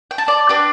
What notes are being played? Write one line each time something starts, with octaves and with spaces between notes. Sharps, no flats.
G5
A5
D5
D4 G4 B4